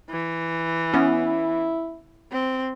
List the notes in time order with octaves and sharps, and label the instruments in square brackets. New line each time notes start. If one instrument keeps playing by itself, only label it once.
[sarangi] E3
[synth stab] B3 C#4 [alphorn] E4
[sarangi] C4